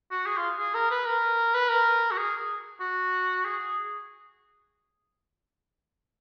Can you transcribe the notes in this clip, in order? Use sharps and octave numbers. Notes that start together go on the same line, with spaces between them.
F#4
G#4
F4
G#4
A#4
B4
A#4
B4
A#4
F#4
G#4
F#4
G#4